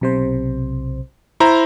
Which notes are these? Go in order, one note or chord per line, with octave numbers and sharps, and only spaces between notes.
B1 C3 C5
E4 C5 A#5